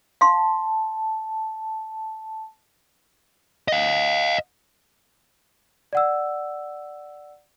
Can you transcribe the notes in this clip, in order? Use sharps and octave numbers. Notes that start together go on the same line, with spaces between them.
F5 A5 C6
D#5 F5
D5 F#5 E6